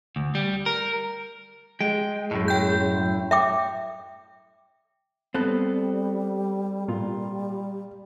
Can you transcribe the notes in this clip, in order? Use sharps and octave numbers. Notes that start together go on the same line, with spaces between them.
D2
G3
A#4
G#3 G5
F#2 A2
G5 G6
E5 G5 D6
G3 B3 C4 A4 F#6
A#2 G3 F4